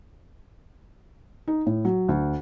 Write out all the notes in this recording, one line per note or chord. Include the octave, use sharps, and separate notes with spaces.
D#4
A2
F#3
D2